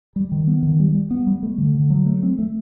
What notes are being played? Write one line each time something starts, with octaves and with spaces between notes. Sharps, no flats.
G3
D#3
B3
D#3
G3
G3
B3
G3
A3
D3
D3
F#3
A3
C4
A3